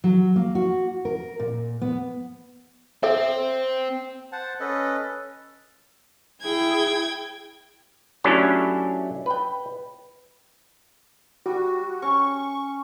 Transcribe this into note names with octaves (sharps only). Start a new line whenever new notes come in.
F#3
A#3
F#4
A#4
A#2
B3
C4 A4 E5
C5 F#5 A5
C#4 A4 B4 D#5
E4 G#4 G5 G#6
F#3 A3 C#4 D4 E4 G4
B4 G5
G3 F#4
C#4 C#6